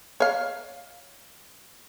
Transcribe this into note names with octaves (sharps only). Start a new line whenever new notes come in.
C#5 F5